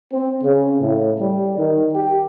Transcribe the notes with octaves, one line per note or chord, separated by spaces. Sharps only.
C4
C#3
A2
G3
D#3
G4